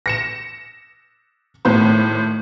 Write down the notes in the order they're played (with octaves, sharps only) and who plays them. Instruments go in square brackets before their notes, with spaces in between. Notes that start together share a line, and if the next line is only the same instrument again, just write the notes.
[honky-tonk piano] A#6 C#7 E7
G#1 A2 C5